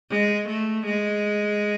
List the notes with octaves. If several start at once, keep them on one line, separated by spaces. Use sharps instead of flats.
G#3
A3
G#3